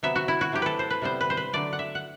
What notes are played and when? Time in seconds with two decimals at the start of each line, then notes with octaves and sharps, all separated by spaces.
0.03 C3 F#3 B3 E5
0.15 F#4
0.28 E4
0.41 F#4
0.52 C3 F#3 A3 G4
0.62 A4 B4
0.79 C5
0.90 B4
1.02 C3 G3 B3 C5
1.21 B4
1.30 C5
1.37 B4
1.53 D3 F#3 A3 D5
1.73 F#5
1.79 E5
1.95 F#5